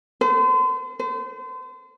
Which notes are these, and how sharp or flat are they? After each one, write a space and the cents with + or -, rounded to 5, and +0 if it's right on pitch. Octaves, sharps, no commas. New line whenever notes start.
C5 -40
C5 -40